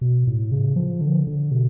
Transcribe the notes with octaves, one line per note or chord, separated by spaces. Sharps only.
B2
A2
C#3
F3
D3
D3
B2